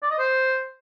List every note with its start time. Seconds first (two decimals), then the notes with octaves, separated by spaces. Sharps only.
0.02 D5
0.11 D#5
0.19 C5